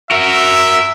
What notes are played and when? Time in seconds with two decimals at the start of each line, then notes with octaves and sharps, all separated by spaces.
0.11 F#4 A#4 E5